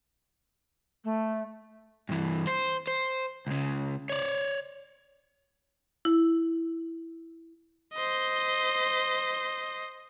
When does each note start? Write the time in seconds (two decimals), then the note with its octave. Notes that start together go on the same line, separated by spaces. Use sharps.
1.04 A3
2.09 G2 E3
2.47 C5
2.87 C5
3.47 C#2 C#3
4.09 C#5 D5
6.05 E4
7.94 C5 D#5